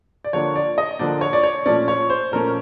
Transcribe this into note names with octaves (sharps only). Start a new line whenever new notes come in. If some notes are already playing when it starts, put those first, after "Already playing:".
D5
D3 F3 A#3 D4 C#5
D5
D#5
D3 F3 A#3 D4 D5
C#5
D5
C#5
A#2 F3 A3 C#4 D5
C#5
C5
A#2 F3 A3 C#4 A#4